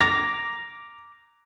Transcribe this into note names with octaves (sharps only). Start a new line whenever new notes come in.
A#5 D6 A#6